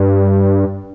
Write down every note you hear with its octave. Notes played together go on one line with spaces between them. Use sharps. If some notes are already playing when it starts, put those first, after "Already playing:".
Already playing: G2